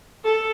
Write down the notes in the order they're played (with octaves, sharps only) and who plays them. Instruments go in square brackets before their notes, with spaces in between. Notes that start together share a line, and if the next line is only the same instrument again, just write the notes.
[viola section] A4